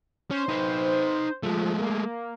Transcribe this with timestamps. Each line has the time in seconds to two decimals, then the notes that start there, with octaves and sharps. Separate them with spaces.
0.31 C#4 C5
0.49 D#4 B4
1.43 F3 G#3 A3
1.79 A#3